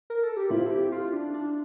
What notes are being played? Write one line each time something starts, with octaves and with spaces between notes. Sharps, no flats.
A#4
A4
G4
C4 E4 F4
A4
G4
F4
D4
D4